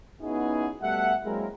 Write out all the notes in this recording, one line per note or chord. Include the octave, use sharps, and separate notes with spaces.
B3 C#4 D#4 E4 F#4 G#4
B2 G3 A3 E5 F#5
F#3 G#3 A#3 C4 E4 A#4